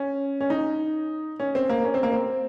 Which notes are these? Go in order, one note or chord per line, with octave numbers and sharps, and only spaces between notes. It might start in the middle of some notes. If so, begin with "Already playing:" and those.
Already playing: C#4
C#4
D#4
C#4
C4
A#3
C#4
C4
A#3
C4